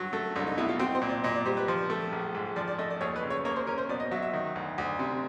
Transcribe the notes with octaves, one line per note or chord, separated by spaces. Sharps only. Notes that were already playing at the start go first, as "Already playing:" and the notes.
Already playing: G2 F#3
A3
C2 D4
D#4
B2 E4
F4
C4 F#4
C5
A#2
D5
A#2 D#5
D5
G3 C5
B4
F3 C5
A3
A#1
G#2
F3 D5
D5
A3 D#5
D5
D#2 C#5
B4
C#3
C#5
A#3 C#5
C5
C#4 A#4
C5
B2 D5
D#5
F#3 E5
E5
D#3
D2
D2
C3